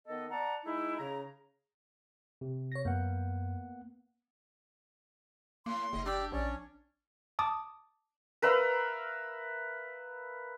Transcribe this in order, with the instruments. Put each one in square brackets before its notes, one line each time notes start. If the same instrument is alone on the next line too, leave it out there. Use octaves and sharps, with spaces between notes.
[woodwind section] D#3 B3 A4 D#5
D5 F#5 A5 A#5
G#3 D#4 E4
C#3 A#5
[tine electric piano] C3
[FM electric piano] C#5 A#6
[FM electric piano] F#2 [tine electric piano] A#3 B3 F#5
[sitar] A2 [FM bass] A#3 [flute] C6
[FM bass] F#1 [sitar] G#2 D#5
[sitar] D4 [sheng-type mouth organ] G4 D5 [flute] E6
[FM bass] A#1 [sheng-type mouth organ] C#4 C#5 [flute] D5
[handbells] A5 D6 D#6
[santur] A#4 B4 E5 F5